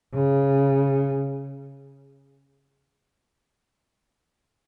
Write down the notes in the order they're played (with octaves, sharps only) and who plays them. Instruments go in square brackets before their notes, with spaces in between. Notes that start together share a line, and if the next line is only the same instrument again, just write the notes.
[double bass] C#3